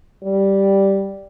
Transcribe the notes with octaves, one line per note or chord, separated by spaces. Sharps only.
G3